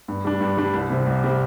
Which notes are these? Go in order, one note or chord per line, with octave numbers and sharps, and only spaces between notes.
G2
G3 D4
G2
G3 D4
C2
C3 G3 C4
C2
C3 G3 C4